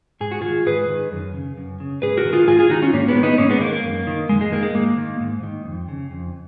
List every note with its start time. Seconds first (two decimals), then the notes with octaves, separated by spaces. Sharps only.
0.21 G#2 G#4
0.31 F#4
0.41 D#3 F4 G#4
0.66 G#2 G#4 B4
0.89 D#3
1.12 F#2
1.34 C#3
1.57 F#2
1.80 C#3
2.02 G#2 G#4 B4
2.17 F#4 A#4
2.25 D#3
2.33 F4 G#4
2.47 G#2 F4 G#4
2.59 F4 G#4
2.70 D#3 D#4 F#4
2.82 C#4 F4
2.93 G#2 A#3 C#4
3.08 G#3 B3
3.16 D#3
3.23 B3 D#4
3.38 G#2 A#3 C#4
3.50 G#3 B3
3.61 D#3 A#3
3.72 A#3
3.84 F#2
4.07 D#3
4.29 F#2 G#3
4.41 G#3
4.52 D#3 A#3
4.63 G#3
4.75 G#2 A#3
4.98 D#3
5.20 G#2
5.43 D#3
5.65 F2
5.89 C#3
6.11 F2